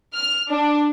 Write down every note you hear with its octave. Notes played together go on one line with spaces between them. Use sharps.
F6
D4